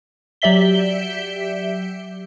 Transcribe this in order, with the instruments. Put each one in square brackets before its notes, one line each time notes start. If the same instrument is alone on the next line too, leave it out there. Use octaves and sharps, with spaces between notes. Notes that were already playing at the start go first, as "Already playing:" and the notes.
[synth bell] F#3 G4 D5 E5 B6 G7